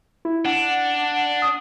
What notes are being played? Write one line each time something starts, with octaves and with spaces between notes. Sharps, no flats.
E4
D4 F#5
D#6